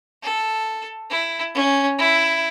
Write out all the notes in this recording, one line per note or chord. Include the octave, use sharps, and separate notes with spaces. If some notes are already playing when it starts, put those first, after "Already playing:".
A4
E4
C#4
E4